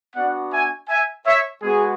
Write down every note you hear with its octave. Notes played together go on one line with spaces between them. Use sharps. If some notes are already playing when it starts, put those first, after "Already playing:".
B3 D4 F#4 D5 F#5
E5 G#5
E5 G#5
C#5 E5
G#3 B3 F#4 G#4